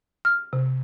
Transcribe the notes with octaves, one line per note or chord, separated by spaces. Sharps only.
F6
C3